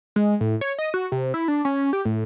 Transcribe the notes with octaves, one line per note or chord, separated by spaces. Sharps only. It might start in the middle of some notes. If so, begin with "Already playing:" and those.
G#3
A2
C#5
D#5
F#4
C3
E4
D4
C#4
G4
A2